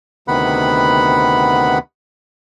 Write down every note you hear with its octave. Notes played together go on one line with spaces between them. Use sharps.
D2 C3 D#3 B3 F#5 B5